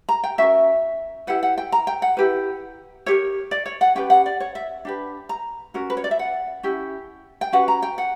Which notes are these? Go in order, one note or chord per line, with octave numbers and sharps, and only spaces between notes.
A#5
G5
C#4 F#4 A#4 E5
E4 G4 B4 F#5
F#5
G5
A#5
G5
F#5
E4 G4 B4
E4 G4 A#4 C#5
D5
C#5
F#5
C#4 G4 B4 G5
F#5
D5
C#5
E5
D4 G4 B4
A#5
C#4 F#4 A#4
B4
C#5
D5
E5
F#5
C#4 E4 G4
G5
C#4 F#4 B4 F#5
A#5
G5
F#5